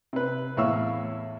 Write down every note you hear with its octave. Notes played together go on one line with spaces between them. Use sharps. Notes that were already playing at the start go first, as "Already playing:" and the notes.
C3 B4
E2 A2 E4 F5 C#6 E6